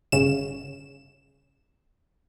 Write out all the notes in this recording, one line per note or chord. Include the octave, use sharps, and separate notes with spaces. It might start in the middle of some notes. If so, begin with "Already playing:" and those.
G1 C#3 E7